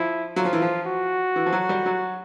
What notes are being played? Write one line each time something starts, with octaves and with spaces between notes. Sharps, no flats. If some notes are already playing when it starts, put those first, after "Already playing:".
Already playing: F3 E4
F#3 F4
F3
E3
F3
F#4
E3
F3
F#3
G3
F#3